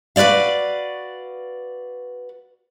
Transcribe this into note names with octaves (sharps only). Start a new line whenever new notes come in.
F#4 B4 C5 D5 F5